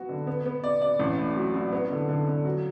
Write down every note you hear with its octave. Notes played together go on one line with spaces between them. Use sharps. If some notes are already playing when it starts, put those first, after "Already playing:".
Already playing: F#3 B3 F#4
D3
B3
B3
D5
D5
A1
A2
F#3
F#3
B3
D3
D3
D3
F#3